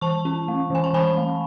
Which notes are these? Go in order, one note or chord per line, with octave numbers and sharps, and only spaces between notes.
E3 A5 C#6
C#4
A3
E3 G#5
A5
E3 G#5 B5
A3